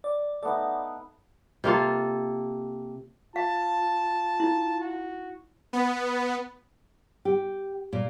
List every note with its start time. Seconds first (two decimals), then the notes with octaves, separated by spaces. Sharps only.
0.04 D5
0.43 A3 B3 D#4 D5
1.64 C3 A#3 F4 A4
3.36 F4 F5 A5
4.40 D#4 E4
4.81 F#4
5.73 B3
7.25 G4
7.93 A#2